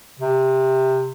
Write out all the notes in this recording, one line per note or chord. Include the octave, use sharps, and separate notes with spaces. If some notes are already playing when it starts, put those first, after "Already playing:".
C3